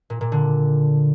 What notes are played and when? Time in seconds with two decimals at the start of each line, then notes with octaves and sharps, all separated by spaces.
0.10 A#2
0.21 A#2
0.32 D3